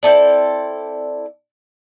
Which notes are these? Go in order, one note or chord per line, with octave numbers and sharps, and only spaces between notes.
C4 E4 A4 D5